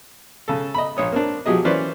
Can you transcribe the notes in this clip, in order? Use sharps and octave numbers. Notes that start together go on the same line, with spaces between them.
C#3 A4
D#5 B5
A#1 C#5 D#6
A#3 C4 D4
F3 F#3 G4 G#4 D#5
E3 A#3 C#4 B4 C5 D5